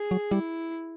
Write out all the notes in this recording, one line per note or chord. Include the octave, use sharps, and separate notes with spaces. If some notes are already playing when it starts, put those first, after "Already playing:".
Already playing: G#4
F#3
G3 E4